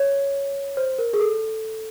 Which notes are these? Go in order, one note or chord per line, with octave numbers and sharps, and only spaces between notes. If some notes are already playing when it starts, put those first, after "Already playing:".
Already playing: C#5
C5
A#4
G#4
A4